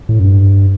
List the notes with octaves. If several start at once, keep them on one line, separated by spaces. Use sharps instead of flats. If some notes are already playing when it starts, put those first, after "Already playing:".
A2
F#2
G2